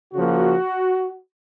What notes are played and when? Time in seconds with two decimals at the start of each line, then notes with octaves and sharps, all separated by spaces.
0.14 C#3 F3 A#3 F#4